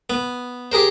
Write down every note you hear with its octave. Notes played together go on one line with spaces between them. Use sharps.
B3
G4 G#4 A#4 C5